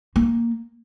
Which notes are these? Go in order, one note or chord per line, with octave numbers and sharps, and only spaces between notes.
A#3